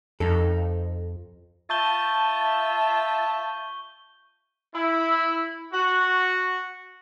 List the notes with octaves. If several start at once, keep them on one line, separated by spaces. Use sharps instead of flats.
F2 D#4 A4
F4 E5 A5 C#6 G6 G7
E4
F#4